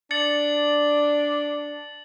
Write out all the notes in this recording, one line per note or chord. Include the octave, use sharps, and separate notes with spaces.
D4 A6 C#7 F#7